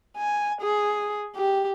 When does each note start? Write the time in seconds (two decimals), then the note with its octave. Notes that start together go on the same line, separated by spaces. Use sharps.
0.17 G#5
0.61 G#4
1.36 G4